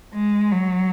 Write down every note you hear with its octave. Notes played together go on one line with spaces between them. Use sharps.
G#3
F#3